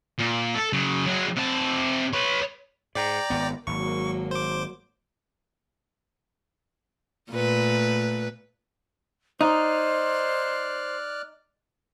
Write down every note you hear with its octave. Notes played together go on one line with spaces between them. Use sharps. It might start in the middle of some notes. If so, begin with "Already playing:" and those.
A#2
A4
C#3 F#3
F#3 G#4
C3 A5
B4 C#5
G#2 D5 G5 A#5
G#1 B3
G#1 F#3 A#3 C#6
C5 D6
A#2 A3 B4
D#4 C5 D5 F6 F#6